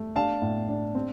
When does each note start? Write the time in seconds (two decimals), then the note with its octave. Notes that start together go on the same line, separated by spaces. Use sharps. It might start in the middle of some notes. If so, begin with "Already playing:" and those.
Already playing: A3
0.16 D4 F5 A5
0.42 A2
0.69 D4
0.95 C4